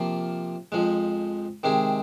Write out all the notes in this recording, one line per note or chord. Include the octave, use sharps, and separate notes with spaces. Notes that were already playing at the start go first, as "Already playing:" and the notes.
Already playing: C3 F3 A#3 F4
F2 F3 G#3
C3 D#3 G#3 C4 G#4